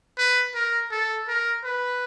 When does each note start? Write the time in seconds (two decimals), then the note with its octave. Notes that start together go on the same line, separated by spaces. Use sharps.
0.18 B4
0.55 A#4
0.91 A4
1.28 A#4
1.64 B4